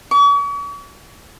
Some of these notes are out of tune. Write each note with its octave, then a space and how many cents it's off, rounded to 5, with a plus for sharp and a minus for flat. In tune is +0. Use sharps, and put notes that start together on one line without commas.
C#6 +45